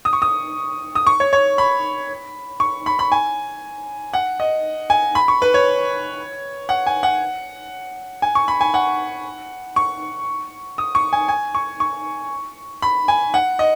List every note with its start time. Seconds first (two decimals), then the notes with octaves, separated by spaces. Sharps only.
0.05 D#6
0.13 C#6
0.22 D#6
0.95 D#6
1.07 C#6
1.20 C#5
1.33 C#5
1.58 B5
2.60 C#6
2.86 B5
2.99 B5
3.12 G#5
4.13 F#5
4.40 D#5
4.90 G#5
5.15 B5
5.28 C#6
5.42 B4
5.54 C#5
6.69 F#5
6.87 G#5
7.03 F#5
8.22 G#5
8.35 C#6
8.48 B5
8.61 G#5
8.74 F#5
9.76 C#6
10.78 D#6
10.95 C#6
11.13 G#5
11.28 G#5
11.55 C#6
11.80 C#6
12.82 B5
13.08 G#5
13.34 F#5
13.59 D#5